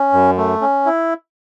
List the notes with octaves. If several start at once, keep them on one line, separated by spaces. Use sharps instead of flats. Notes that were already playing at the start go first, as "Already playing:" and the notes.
Already playing: C#4
F#2
A3
C#4
E4